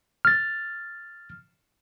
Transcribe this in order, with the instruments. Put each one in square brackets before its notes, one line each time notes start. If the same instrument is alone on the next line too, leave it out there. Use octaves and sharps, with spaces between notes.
[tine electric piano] F6 A6